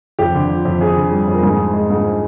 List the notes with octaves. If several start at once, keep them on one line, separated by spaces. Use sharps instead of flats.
F2 G4
D3
F3
F2
F2 G#4
D3
G3
F2
A#4
G#2 G#4
F3
G#3
G#2